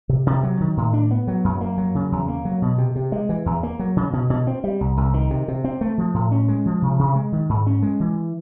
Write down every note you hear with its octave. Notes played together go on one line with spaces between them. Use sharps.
C3
C3
F#3
D#3
A2
D4
B3
F#3
F#2
A#3
F#3
C#3
E2
A#3
F#3
B2
C3
C3
G#3
E3
E2
A#3
F#3
C#3
B2
B2
C4
G3
C2
C2
D#3
C3
C3
C4
A3
F3
A2
C#4
G#3
F3
C3
C3
G#3
D#3
G#2
C#4
G#3
E3